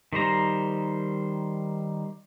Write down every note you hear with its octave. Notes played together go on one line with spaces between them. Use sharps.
D#3 G3 C5 A#5